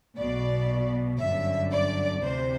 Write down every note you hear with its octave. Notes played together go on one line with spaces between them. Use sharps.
B1 B2 D5
G1 F#2 D3 E5
D5
D2 C3 E3 C5